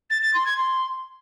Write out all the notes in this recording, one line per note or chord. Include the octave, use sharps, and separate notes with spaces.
A6
A6
C6
G#6
C6